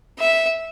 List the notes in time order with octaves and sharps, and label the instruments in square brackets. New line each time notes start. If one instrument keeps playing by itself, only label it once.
[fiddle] E5